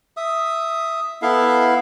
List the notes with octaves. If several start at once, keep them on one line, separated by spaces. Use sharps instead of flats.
E5 D#6
B3 E4 A4 E5 F5